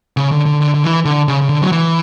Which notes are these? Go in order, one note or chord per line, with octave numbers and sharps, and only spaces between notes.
C#3
D3
D3
D3
D3
E3
D3
C#3
C#3
D3
F#3
E3